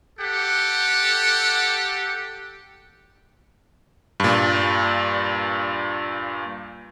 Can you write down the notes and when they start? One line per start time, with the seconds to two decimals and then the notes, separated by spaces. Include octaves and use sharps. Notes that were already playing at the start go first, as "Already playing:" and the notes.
0.19 G4 A4 F#5
4.20 G2 A#2